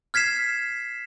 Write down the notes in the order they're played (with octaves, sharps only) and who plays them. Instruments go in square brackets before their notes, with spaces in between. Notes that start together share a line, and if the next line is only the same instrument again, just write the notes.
[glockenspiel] F6 G#6 B6 C7 E7